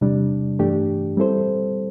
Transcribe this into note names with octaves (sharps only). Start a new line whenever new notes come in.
E2 C3 G3 D4
G2 E3 A3 D4 G4
G3 C4 E4 A4 C5